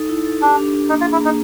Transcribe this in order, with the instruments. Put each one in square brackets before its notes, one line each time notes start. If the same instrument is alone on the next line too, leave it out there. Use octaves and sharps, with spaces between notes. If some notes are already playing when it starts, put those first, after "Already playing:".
Already playing: [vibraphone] D#4 A4
E4
A4
[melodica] D4 [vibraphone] G4
[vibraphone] D4
D4
[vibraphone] A#3 [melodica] D#4
[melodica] F4
[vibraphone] G#4
[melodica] E4
[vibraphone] A#3 [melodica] D#4